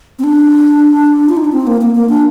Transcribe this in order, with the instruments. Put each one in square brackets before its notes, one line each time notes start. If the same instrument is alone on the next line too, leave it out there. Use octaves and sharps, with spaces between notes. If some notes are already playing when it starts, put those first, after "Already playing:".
[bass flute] C4
D4
F4
D#4
D4
C4
A#3
A#3
A#3
D4